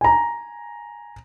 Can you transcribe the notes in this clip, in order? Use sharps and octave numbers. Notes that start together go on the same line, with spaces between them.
G#5 A#5